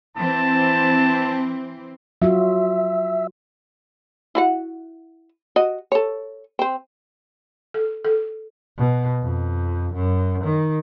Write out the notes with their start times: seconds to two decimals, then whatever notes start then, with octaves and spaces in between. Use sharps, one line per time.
0.17 E3 C4 A5
2.22 F#3 F4 F#4 E5
4.35 E4 F#4 F#5
5.56 F#4 D#5
5.92 A4 C#5
6.59 C4 C5
7.74 A4
8.05 A4
8.78 B2
9.23 F2
9.94 F#2
10.44 D#3